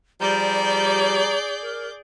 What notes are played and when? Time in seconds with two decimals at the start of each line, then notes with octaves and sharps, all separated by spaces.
0.21 F3 G3 G#4 D5 A#5 G6
1.62 A#4